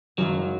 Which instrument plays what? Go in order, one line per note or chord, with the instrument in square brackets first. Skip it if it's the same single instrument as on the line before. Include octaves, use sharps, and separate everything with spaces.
[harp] F#1 F#2 D#3 G#3 [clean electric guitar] F#3